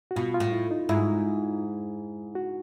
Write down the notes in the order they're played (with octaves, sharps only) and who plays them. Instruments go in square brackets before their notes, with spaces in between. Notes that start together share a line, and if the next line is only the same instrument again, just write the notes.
[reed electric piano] F#4
[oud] B2 [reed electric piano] F4
[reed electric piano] F4
[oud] A2
[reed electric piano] E4
D#4
[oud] G#2 [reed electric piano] E4
[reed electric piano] F#4